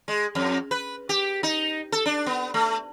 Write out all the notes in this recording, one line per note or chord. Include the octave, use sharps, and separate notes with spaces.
G#3
F2
B4
G4
D#4
A4
D4
B3
A3